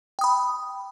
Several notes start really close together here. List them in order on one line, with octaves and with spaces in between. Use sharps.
G5 D#6 B5